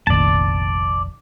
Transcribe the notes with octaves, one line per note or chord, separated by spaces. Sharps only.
F1 A#1 D#3 D5 A5